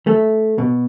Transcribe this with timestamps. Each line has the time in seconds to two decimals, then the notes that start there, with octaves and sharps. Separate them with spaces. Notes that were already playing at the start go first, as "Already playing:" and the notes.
0.07 A3
0.58 B2